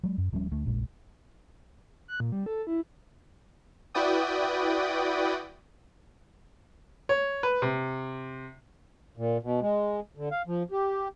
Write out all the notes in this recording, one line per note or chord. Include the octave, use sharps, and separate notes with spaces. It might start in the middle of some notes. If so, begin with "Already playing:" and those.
F#3 G#3
F#2
D1 F3 G3 C#4
D2 A3
F1 A#1 A#2 G#3
F#6
A#2
G3
A4
E4
E4 F#4 B4 D5 G5 D#6
C#5
B4
C3
A#2
B2
G#3
D3
F5
F3
G4